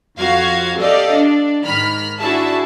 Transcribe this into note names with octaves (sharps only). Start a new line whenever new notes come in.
F2 F#4 F5 G#6
G4 A4 D5 D#5 F5
D4
G#2 D#3 B5 F6
D4 E4 F#4 G#4 E5 A5